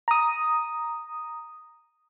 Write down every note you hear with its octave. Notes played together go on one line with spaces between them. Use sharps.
A#5 D#6